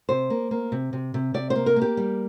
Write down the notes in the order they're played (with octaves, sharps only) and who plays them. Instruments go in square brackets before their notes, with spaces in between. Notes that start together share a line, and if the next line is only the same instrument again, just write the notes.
[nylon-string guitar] C3 C5
A#3
A#3
C3
C3
C3
C3 D5
C5
A#3
A#4
A#3
G4
G3